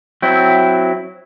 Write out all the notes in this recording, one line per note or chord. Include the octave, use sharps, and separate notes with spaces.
F#3 C4 E4